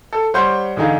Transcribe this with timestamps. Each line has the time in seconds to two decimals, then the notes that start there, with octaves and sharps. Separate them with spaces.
0.13 A4
0.34 G3 C5 C#5 F#5 C6 G6
0.76 E1 D3 D#4 G#4 F5